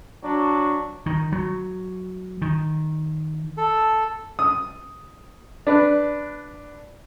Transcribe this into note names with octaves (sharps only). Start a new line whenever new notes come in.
F#3 D4
D#3
F#3
D#3
A4
D#6
D4 B4